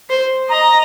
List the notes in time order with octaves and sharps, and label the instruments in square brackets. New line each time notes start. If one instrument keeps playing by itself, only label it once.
[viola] C5
[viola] D#5 [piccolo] A#5